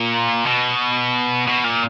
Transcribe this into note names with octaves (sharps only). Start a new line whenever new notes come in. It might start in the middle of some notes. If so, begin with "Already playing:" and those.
Already playing: A#2
B2
B2
A#2